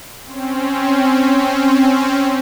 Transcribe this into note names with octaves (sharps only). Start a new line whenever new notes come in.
C4 C#4